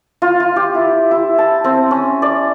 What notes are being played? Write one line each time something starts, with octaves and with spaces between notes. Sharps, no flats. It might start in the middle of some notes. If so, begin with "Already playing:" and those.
F4
F4
G4
E4
E4
A5
C4
C#4
D5